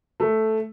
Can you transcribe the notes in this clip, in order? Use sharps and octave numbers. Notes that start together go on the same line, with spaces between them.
A3